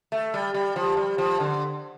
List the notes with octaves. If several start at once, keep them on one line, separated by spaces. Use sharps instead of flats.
A3
G3
G3
F3
G3
F3
D3